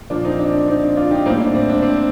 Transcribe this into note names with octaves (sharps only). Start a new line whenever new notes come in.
A#2 F3 A#3 D4
C4 D#4
D4
D4
C4 D#4
D4
D4 F4
D#4 G4
A2 G3 A#3 C4 D#4
D4
C4
D4
C4